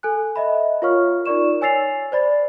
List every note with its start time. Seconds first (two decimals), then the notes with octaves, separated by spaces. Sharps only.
0.03 A4 G#5 F#6
0.36 D#5 E5 B5
0.82 F4 A#4 C#5 F5 C#6 F6
1.26 D#4 F4 A#4 D5 C#6 E7
1.61 C#5 G#5 E6 A6 C7 F7
2.12 C5 D5 B5 A6